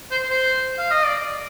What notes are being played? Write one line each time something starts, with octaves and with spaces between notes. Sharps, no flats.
C5
C5
F5
D#5
D5